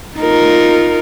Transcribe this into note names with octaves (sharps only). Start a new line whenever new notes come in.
D#4 F4 A#4